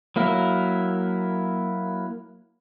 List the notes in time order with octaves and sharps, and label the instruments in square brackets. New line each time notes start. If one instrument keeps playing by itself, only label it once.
[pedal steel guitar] F#3 A#3 E4 A#4